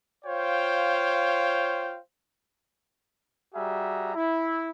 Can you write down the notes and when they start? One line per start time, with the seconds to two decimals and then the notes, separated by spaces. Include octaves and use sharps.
0.25 F4 C5 C#5 F5 G5
3.53 G3 F#4 G#4 E5 A#5
4.14 E4